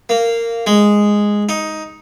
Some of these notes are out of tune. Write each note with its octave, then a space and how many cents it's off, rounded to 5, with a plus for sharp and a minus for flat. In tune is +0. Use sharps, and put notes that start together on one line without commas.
A#3 -15
G#3 -5
D#4 +10